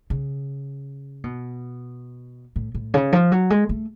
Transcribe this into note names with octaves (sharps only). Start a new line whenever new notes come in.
C#3
B2
A2
A2
C#3
F3
F#3
G#3
A3